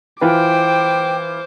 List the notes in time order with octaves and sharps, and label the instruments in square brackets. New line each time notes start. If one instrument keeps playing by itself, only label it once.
[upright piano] E3 F4 B4 [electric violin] C5 D6 [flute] G5